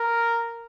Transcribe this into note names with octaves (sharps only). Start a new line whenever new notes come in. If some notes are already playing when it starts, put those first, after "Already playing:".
Already playing: A#4